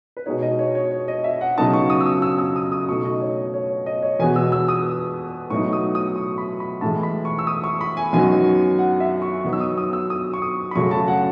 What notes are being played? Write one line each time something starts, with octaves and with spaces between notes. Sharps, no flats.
B4
B2 G#3 D#4 C#5
D#5
C#5
C#5
C#5
D#5
E5
F#5
C#3 F#3 B3 D#4 A5
C#6
D#6
E6
D#6
E6
E6
D#6
D#6
B2 A3 D#4 C#6
D#5
C#5
C#5
D#5
C#5
E2 B2 G#3 B3 G#5
E6
E6
D#6
A2 F#3 B3 D#4 C#6
D#6
D#6
C#6
B5
B5
A2 E3 G#3 A5
B5
C#6
E6
D#6
C#6
B5
G#5
F#2 D#3 F#3 B3 G#5
F#5
E5
C#6
D#3 F#3 B3 D#4 C#6
E6
D#6
D#6
E6
D#6
C#6
D#6
B5
F#2 C#3 F#3 A3 C#6
A5
F#5